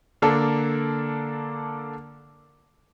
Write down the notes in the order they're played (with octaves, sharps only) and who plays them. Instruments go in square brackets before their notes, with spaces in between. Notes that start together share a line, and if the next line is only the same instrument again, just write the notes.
[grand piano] D3 A#3 D4 A4